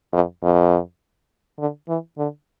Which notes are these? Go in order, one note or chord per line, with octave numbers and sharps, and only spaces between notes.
F2
F2
D3
E3
D3